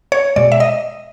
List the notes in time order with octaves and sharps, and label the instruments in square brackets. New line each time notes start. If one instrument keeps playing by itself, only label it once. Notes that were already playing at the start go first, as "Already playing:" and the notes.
[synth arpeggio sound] C#5
B2 G#3 D5
E5
D#5